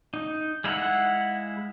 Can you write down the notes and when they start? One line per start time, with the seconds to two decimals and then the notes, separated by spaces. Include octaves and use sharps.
0.14 D#4
0.64 G#3 E4 F5 F#5